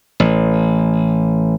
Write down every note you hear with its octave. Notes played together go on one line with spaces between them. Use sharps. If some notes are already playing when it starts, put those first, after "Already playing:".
A1